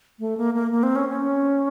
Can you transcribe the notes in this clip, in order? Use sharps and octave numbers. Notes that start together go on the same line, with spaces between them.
A3
A#3
A#3
A#3
C4
C#4
C#4